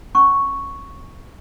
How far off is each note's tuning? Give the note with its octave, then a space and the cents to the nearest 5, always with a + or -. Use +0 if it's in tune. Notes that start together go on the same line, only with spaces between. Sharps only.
C#4 -30 C#6 +0